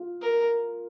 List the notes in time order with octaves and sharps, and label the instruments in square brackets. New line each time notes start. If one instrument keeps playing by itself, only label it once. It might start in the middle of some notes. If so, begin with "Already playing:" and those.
Already playing: [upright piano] F4
[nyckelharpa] A#4